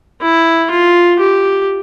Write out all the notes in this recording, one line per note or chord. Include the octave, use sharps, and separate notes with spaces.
E4
F4
G4